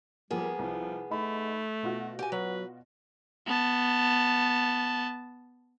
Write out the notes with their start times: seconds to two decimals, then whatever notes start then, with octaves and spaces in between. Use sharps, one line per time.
0.31 F3 G3 A#3 B3 G#4
0.59 C2 F3
1.11 A3 D#4 B5
1.83 B2 F4 F#4
2.19 G4 G#5
2.32 F#3 B4
3.47 B3 A5